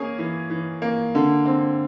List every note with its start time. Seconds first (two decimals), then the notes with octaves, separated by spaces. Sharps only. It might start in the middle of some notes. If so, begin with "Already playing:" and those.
Already playing: A#3 C#4 G#4 G#5
0.19 E3
0.50 E3
0.82 A#3
1.15 D3
1.45 C4